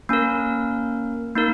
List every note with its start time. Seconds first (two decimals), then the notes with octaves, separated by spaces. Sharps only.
0.09 A#3 C#4 A#4
1.35 A#3 D#4 A#4